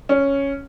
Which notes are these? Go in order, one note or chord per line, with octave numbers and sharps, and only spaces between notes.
C#4